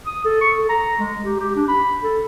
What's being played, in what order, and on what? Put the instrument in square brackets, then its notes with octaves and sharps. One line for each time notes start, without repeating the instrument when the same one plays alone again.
[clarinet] D#6
A4
C#6
A4
A#5
G#3
G4
G4
D4
B5
A4